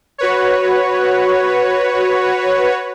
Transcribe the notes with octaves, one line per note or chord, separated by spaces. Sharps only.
F#4 B4 C#5